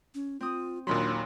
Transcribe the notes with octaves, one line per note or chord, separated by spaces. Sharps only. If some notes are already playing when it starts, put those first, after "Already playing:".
C#4
C4 F4 D#6
D#2 A#2 D#3 F#3 D4 B5 C6